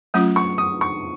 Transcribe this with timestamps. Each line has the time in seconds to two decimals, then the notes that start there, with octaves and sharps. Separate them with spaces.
0.14 F#3 A3 C#4 F4 D#6
0.36 C#6
0.58 D#6
0.81 C#6